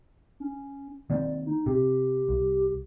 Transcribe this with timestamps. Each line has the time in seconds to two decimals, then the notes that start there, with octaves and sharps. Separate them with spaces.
0.40 C#4
1.10 D#3 A#3 C4 D5
1.46 D#4
1.66 C3 G4
2.29 C2